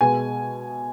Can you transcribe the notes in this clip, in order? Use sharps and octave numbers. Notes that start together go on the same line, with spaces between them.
B2 G#3 B3 G#5